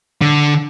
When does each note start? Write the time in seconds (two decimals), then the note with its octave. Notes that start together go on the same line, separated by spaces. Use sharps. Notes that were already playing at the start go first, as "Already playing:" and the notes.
0.21 D3